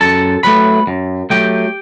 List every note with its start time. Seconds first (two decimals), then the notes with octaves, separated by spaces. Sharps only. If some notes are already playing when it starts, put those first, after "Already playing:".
0.01 F#2 A4 A5
0.43 F#3 A3 B4 B5
0.87 F#2
1.30 F#3 A3 G4 G5